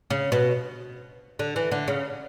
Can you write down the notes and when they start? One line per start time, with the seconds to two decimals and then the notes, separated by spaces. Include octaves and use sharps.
0.10 C#3
0.32 B2
1.39 D3
1.56 E3
1.71 D3
1.88 C#3